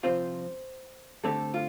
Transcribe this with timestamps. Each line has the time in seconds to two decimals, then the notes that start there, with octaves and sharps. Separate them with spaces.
0.03 C2 C3 F3 C4 F4 C5
1.23 G2 D3 A3 C4 G4 A4
1.54 F4